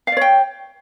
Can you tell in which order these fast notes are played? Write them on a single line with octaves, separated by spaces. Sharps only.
F5 D5 C#5 G5